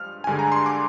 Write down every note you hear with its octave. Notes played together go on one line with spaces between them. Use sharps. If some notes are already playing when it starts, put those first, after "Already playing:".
Already playing: G2 F3 G#3 F6
G2 D3 G#3 G#5
A#5
C6
D6